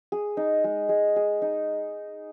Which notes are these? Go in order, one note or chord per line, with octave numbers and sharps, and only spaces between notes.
G#4
D#4
G#3
G#3
G#4
D#4